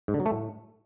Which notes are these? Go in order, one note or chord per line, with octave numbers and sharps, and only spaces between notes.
G#2
D3
F#3
A3
A2